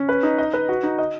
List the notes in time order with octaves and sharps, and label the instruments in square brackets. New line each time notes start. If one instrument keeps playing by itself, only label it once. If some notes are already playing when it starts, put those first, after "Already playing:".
Already playing: [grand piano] C#4
B4
D#4
D#5
B4
F#4
D#4
D#5